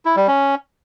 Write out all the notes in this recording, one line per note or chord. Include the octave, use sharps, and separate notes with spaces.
E4
G3
C#4